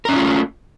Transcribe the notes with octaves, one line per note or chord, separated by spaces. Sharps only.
A3 C#4 D#4 F4 A#4